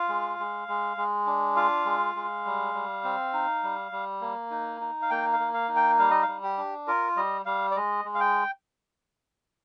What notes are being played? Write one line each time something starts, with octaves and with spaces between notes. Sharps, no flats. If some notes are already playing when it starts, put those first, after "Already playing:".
Already playing: F4 F5
G#3
G#3
G#3
G#3
D4
F4 F5
G#3
G#3
G3
G3
C4
D#4
G3
G3
A#3
D#4
D#4
F5
A#3 G5
F5
A#3
F5
D#4
G5
G3 F5
D#5
G3 F5
G4
D4
F4 A#4
G3 D#5
G3 F5
D5
G#3 D#5
G#3
F5
G5